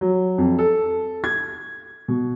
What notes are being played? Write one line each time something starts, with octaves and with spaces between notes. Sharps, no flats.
F#3
F2
A4
G#6
B2